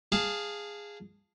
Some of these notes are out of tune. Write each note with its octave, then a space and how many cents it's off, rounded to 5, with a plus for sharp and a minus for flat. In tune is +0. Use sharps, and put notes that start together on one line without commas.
G#4 -10 F5 +0 A5 +0